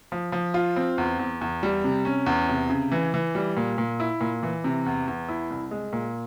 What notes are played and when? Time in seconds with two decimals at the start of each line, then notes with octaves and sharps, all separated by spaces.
0.12 F3
0.32 F3
0.54 F4
0.76 C4
0.98 E2
1.19 E2
1.41 E2
1.63 G3
1.84 C3
2.05 C#4
2.26 E2
2.49 C3
2.69 C#3
2.92 E3
3.14 E3
3.35 G3
3.57 A#2
3.78 A#2
4.00 E4
4.21 A#2
4.43 E3
4.64 C3
4.86 E2
5.08 E2
5.29 E4
5.50 C2
5.71 G#3
5.93 A#2